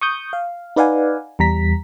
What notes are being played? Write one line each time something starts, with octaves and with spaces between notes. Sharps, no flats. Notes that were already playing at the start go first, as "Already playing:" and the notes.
C#6 D#6 G6
F5
D#4 B4 D5 F5 F#5 G#5
E2 G3 A#5 B6